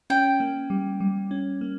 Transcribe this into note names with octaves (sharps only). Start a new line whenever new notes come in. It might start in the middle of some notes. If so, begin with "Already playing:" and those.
C#4 G5
A#3
G3
G3
C#4
A#3